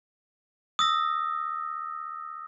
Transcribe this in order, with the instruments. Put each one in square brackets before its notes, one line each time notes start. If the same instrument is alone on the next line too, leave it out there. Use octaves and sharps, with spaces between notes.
[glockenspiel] D#6 E6 A#6